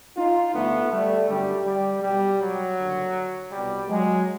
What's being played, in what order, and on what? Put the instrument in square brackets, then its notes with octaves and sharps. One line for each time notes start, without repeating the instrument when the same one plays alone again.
[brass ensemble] D#4 F4
G1 F2 D3 A3 B3
G3 A3
G1 F#2 D3 G3
G3
B1 B2 G3
F#3
F#1 F#2 D3
C2 B2 G3
F#3 G#3